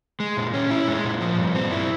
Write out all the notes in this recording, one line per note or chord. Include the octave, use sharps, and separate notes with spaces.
G#3
A#2
C#4
E4
G#3
A#2
F3
G2
C4
E4